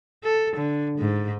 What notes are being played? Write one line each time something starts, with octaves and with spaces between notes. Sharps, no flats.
A4
D3
G#2